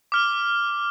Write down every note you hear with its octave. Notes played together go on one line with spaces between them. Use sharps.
D6 F6 G7